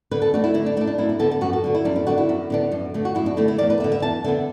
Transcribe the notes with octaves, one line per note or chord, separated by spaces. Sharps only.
D3 B4
A4
A3 D4 F#4
E4
D3 E4
D4
A3 D4 E4
D4
F#2 E4
E4
D3 B3 A4
A4
F#2 F#4
A4
D3 B3
E4
F#2 D4
E4
D3 B3 D4 F#4
E4
F#2
D3 B3 D4
F#2
D3 A3
F#4
F#2 E4
D4
D3 A3 E4
E4
E2 D5
B4
D3 B3 E5
E5
E2 A5
D3 B3 E5